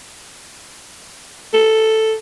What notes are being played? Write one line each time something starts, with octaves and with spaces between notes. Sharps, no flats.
A4